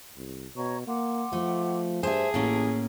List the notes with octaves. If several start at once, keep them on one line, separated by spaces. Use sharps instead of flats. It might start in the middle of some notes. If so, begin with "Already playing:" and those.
C2
B2 C#5 A#5 C#6
A#3 F#5 C6 D6
F3 A3
G2 G#4 C5 E5 A5
A1 A2 A#3 C#4